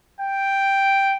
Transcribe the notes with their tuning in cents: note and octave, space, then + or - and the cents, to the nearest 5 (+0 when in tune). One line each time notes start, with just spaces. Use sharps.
G5 +0